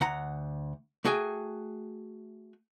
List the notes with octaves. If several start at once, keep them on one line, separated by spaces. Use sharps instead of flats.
D2 F#5 A#5
A3 F#4 G#4 G5 G#5